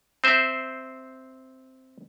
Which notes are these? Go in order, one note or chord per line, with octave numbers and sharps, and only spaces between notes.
C4 C5 E5